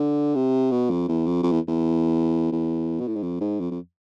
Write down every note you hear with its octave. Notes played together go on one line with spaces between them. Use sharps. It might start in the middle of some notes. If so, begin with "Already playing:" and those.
Already playing: D3
C3
B2
F2
E2
F2
F2
E2
E2
E2
B2
A2
G#2
F2
G#2
F2
F2